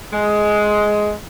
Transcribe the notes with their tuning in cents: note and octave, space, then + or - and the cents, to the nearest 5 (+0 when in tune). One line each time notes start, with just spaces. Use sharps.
G#3 +10